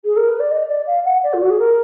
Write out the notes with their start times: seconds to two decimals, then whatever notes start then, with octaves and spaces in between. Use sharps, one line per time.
0.04 G#4
0.16 A#4
0.28 B4
0.39 D5
0.50 D#5
0.68 D5
0.86 F5
1.04 F#5
1.23 D5
1.33 F4
1.41 F#4
1.50 G#4
1.59 A#4